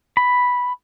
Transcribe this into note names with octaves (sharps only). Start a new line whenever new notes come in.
B5